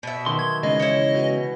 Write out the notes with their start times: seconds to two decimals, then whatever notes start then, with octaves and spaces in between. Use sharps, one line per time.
0.03 B2 E5
0.26 B1 D#3 B3 D5 C6
0.39 G#6
0.63 C#3 E3 G#3 D#4 G#4 D#5
0.80 E4 C#5
1.14 B2 G#5